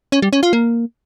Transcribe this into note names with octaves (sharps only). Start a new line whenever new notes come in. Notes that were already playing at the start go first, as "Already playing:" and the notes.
C#4
G3
C#4
F4
A#3